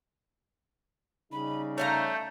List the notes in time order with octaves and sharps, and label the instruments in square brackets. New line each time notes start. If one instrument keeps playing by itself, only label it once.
[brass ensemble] C#3 G3 D#4 [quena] B5
[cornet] A3 [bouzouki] C#5 F5 A#5 [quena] G6